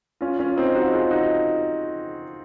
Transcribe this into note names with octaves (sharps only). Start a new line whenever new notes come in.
C#4 F4
C#4 F4
C4 D#4
D#4 F#4
F4 G#4
D#4 F#4